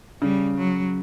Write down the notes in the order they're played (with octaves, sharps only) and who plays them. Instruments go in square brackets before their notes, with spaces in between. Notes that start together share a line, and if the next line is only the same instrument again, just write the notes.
[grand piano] C#3 [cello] G3
[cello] F#3